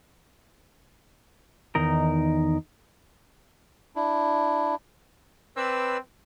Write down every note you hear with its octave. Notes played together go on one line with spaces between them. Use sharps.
E2 D#3 D#4 A#4
D4 E4
C4 B4 D5 E6